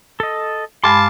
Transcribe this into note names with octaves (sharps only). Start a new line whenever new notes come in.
A4 D#5
G2 G#3 F5 A5 B5 C6 D6